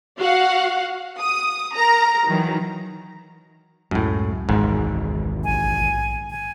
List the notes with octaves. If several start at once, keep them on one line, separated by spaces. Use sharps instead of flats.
F#4 F5 F#5
D#6
A#4 A#5
D#3 E3 F#3
C#2 F#2 A2 G#3
G#1 E2 G#2 B2
A#1 G#5
G#5